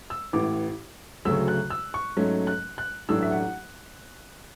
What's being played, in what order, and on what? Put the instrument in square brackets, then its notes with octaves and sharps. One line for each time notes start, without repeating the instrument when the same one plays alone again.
[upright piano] E6
A1 A2 E3 D6
D2 C#3 F#3 A3 E6
F#6
E6
C#6
G#2 F#3 A3 C#4
F#6
F#6
A1 A2 F#3 A3 D4 E6
E5
F#5